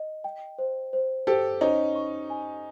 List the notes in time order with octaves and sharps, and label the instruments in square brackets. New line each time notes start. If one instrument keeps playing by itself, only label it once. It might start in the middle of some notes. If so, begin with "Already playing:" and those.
Already playing: [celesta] D#5
G5
C5
C5
[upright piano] G4 A4 [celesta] C5
[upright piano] C#4 D#4 [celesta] C5
[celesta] C#6
G#5